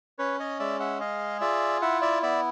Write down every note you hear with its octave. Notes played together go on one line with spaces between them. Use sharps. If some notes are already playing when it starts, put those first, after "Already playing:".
C#4 B4 C#5
C#5 D#5
G#3 D5 E5
E5 F#5
G#4 D#5 F5
F4 D5 E5
E4 E5 F#5
D5 E5
B3 D5 E5